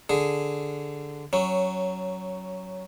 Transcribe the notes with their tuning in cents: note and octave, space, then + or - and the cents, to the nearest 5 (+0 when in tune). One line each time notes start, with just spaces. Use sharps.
D3 +0 G#4 +0
F#3 +10 C#4 +0